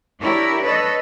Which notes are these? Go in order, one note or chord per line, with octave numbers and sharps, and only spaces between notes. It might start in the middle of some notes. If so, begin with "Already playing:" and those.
D4 E4 G4 A#4 C#5
A4 B4 C#5 D#5